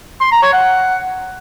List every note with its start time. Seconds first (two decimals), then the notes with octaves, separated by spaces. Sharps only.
0.21 C6
0.32 A#5
0.42 C#5
0.53 F#5